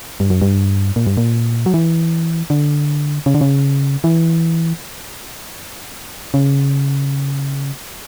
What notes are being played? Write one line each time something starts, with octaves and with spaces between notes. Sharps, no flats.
G2
F#2
G2
A#2
G2
A#2
F#3
E3
D3
C#3
D3
C#3
E3
C#3